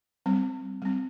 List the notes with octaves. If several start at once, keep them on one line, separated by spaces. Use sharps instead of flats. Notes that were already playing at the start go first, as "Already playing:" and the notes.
G3 C4
G3 C4